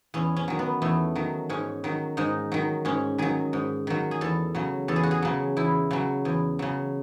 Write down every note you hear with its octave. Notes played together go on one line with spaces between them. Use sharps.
E2 C#4
C#4
D#3 F#3
B3
E2 A3
D#3 F#3
G#2 C#4
D#3 F#3
G#2 D#4
D#3 F#3
G#2 C#4
D#3 F#3 G#4
G#2
D#3 F#3
G#4
E2 A4
C#3 F#3
E2 A4
G#4
F#4
G#4
C#3 F#3
E2 E4
C#3 F#3
E2
C#3 F#3